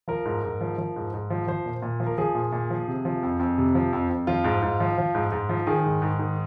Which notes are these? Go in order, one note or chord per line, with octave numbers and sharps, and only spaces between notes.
F3 A#4
G#2
G#2
F3
F3
G#2
G#2
F3
F3 C5
A#2
A#2
F3
A#4
F3 G#4
A#2
A#2
F3
C3
F3
F2
F2
C3
F3
F2
F2
F3 F4
G#2
G#2
F3
F3
G#2
G#2
F3
D#3 G#4
G#2
G#2
D#3